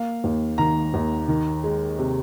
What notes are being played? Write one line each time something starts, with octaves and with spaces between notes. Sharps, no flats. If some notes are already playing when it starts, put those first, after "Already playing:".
Already playing: A#3 F5
D#2
D#3 A#5
D#2
D#3
G#3
C3